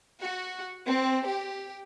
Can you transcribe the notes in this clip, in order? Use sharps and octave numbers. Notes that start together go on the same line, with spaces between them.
F#4
C4
G4